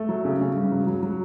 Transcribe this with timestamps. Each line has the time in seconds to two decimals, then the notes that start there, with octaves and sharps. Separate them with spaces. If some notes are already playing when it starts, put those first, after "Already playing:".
Already playing: A3
0.09 F#3
0.25 C#3
0.41 C#3
0.56 G2
0.71 F#3
0.87 F#3
1.03 F#3